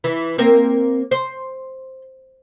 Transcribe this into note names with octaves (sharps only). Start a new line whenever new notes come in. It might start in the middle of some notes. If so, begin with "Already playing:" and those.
E3
A#3 C4 A#4
C5